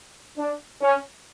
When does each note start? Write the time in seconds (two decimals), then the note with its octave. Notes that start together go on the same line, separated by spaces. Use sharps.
0.38 D4
0.81 C#4